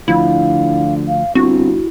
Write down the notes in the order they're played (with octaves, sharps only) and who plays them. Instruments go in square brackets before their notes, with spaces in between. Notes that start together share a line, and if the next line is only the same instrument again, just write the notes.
[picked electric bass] D2 F3 [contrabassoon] D3 [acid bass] E4 [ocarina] F5
[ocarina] F5
[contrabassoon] G1 [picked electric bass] C4 [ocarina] E4 [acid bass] F#4